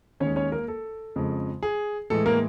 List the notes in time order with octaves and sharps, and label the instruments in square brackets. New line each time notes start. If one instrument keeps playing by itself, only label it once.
[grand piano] D#2 D#3 G#3 C#4 C#5
C#4 C#5
A#3 A#4
A4
F2 C#3 F3 G#3
G#4
A2 E3 G#3 A4
A#3 A#4